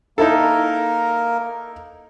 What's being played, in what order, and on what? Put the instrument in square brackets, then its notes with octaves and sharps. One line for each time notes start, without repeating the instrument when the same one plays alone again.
[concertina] A#3 A#4 [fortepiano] D#4 E4 A4